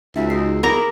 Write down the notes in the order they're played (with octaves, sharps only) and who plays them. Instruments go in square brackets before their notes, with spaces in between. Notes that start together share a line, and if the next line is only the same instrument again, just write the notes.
[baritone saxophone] C#2 [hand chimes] D#4 F#4 [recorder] E5
[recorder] D#4 [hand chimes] G#4 E6 C7
[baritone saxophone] E4 [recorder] G#4 [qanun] A#4 A#5 [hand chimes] B5 D6